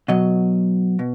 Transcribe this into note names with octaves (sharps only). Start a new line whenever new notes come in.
B2 F#3 D#5
B2